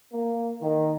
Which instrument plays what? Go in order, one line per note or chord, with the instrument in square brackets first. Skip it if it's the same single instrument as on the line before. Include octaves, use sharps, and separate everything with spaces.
[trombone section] A#3
D#3